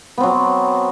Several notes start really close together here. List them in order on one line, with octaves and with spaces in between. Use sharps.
B3 C4 F#3